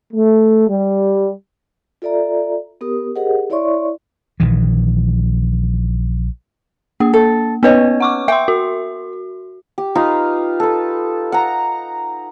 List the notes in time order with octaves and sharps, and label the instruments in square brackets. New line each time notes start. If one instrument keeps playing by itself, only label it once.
[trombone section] A3
G3
[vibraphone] F4 A4 D5 E5 A#5
B3 G4 A#4 D#6
G4 G#4 A#4 C5 D#5 F#5
E4 C#5 D5 E5 C6 C#6
[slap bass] A#1 D#3 E3
[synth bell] A#3 [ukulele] G#4
[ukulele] A4
[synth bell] B3 B4 [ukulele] C#4 C#5 D#5
[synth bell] F#5 C#6 D6
[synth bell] E5 C6 [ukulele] G5
[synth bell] F#4
[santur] G4
D#4 F4 B4 F5
A4 B4
F#5 A#5